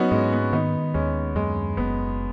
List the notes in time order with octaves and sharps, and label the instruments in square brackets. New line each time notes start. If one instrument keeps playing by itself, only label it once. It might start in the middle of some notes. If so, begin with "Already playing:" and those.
Already playing: [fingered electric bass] F#3 [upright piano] B3 C#4 D#4 F#4
[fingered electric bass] G#2 [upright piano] G#3 C#4
[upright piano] B3
[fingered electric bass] D#3 [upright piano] B3 D#4
[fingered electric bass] D#2 [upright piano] G#3 C#4
[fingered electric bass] F#2 [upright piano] G#3
[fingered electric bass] F#1 [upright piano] B3